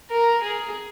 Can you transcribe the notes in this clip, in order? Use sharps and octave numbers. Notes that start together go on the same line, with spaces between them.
A#4
G#4